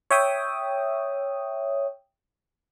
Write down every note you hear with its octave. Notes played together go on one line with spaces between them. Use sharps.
C#5 E5 G5 D#6